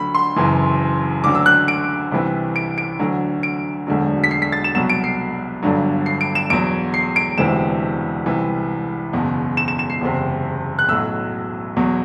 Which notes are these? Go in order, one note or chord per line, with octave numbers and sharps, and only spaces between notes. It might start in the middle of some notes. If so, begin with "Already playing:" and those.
Already playing: D2 D3 F#3 B5
C6
F#1 F#2 E3
D2 D3 F#3 D6
E6
F#6
D7
C2 C3 E3
D7
D7
D2 D3 F#3
D7
E1 D2 D3 F#3
B6
C7
B6
A6
E7
C2 B2 F#3 E7
D7
C7
G1 G2 D3 F#3
C7
D7
E7
E2 B2 F#3 D7
C7
D7
E1 D2 C3 E3 E7
C2 C3 E3
F#1 E2 B2
E7
E7
E7
C7
F#1 E2 C3
F#6
B1 A2 F#3 E6
E2 B2 F#3